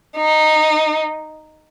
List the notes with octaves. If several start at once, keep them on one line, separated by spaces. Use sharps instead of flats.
D#4